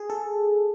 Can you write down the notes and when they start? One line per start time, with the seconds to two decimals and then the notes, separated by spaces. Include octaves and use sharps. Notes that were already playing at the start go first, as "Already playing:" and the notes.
Already playing: G#4
0.10 A4